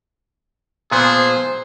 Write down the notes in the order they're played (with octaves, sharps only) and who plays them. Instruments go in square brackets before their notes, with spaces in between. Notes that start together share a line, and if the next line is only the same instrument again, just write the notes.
[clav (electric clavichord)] A#2 F3 B3 [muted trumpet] G#4 [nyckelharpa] C5